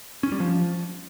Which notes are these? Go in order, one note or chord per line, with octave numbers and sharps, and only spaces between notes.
C#4
G3
F3